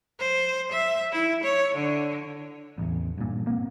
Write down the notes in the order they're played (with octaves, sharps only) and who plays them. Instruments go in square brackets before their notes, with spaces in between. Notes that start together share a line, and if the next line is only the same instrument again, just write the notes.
[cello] C5
E5
E4
C#5
D3
[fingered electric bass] A1 E2
G2 A#2
A#3 C4